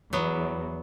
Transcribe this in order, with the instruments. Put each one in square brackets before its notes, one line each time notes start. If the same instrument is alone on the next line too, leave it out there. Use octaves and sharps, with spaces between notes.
[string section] E2 [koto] F#3 B3